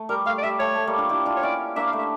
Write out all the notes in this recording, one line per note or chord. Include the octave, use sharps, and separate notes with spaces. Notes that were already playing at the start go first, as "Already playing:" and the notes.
Already playing: A3
G3 A#4
A3 F5
D5
G3 E5
A3 C#5
A3
G3 A#3
D4 F4
E4 G4
D4 F4
C#5
C#4 E4 D5
A#3 D4 E5
F5
A3
E5